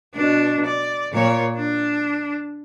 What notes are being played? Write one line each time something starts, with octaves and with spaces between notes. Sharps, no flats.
B2 D4
D5
A#2 C#5
D4